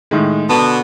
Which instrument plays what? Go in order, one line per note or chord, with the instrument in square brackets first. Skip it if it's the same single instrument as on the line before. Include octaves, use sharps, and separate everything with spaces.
[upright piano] A2 D#3 G#3
[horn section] B2 D3 B3 [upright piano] A5